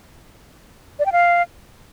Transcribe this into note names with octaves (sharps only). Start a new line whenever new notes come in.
D5
G5
F5